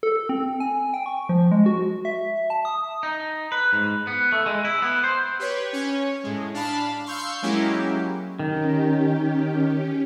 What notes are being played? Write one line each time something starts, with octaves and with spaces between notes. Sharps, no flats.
A4
C4
G#5
G5
C#6
F3
G#3
F#4
E5
A5
D#6
D#4
B4
G#2
B3
A3
G#3
E4
B3
C5
G4 B4 C#5
C#4 C#5
A2 G#3
D4 F5 A5 B5
F5 C6 C#6 E6 G6
F#3 G#3 A#3 C#4 E4 G4
D#3 C#4 G4